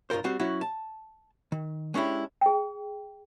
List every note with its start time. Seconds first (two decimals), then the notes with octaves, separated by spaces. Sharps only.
0.10 B1 G2 F4 A#4 C5
0.24 G3 C4 F#4 C5
0.39 F#3 C#4 E4 F#4
0.61 A5
1.52 D#3
1.94 G#3 C#4 D4 E4 G4
2.41 G#4 G5